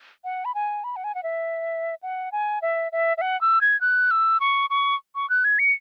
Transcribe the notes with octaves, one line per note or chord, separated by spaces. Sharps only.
F#5
B5
G#5
B5
F#5
G#5
F#5
E5
F#5
G#5
E5
E5
E5
F#5
E6
G#6
F#6
E6
C#6
C#6
C#6
F#6
G#6
C#7